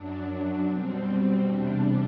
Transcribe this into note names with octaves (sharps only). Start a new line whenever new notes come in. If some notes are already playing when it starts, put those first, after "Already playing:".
Already playing: F#2 F#3 D4
B2 G3 C4
E2 C3 G3 D4